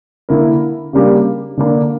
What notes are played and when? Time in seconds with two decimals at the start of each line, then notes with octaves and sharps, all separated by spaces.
0.29 D3 A#3 E4 A#4
0.93 C#3 G3 A#3 D4 G4
1.57 D3 A#3 D4